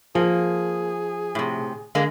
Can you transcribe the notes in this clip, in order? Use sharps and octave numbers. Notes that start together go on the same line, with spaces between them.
F3 A#3 G#4
A2 C3
D3 G#3 A#3